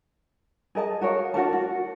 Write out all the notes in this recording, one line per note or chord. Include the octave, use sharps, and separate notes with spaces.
G#4 A#4 D#5 A5
F#4 A#4 C#5 F5
D4 F#4 A#4 A5
F#4